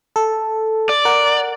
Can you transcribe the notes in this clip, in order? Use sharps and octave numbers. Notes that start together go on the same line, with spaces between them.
A4
D5
A#4 F#5